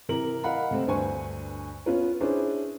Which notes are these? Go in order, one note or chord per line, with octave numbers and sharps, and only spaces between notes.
C3 E3 A#4 F#7
A#4 D#5 F5 F#5 B5
C3 A3 C4
D2 G2 B4 C5 G#5 C#6
B3 C#4 F4 B4
C#4 D4 E4 G#4 B4 C5